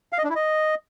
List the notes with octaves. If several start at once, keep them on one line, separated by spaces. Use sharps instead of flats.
F5
D#5
D4
E4
D#5